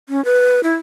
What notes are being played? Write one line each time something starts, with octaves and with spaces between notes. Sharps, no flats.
C#4
B4
E4